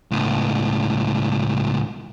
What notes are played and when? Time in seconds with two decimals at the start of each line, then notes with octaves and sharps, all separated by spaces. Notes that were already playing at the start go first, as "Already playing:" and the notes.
0.11 C#2 A2